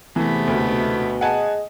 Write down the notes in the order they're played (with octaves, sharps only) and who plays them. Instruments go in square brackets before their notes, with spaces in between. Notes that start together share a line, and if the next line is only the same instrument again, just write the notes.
[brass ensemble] E2 G#2 C3 [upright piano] E3 [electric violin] A3 B3
[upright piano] D2 [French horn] B2
[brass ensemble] G#4 D#5 [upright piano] F#5 G#5 A5